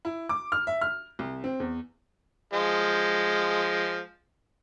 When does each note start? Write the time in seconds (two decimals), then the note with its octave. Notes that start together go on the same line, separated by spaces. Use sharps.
0.05 E4
0.29 D6
0.52 F6
0.67 E5
0.81 F6
1.19 C2
1.44 C4
1.60 E2
2.53 F3 G#3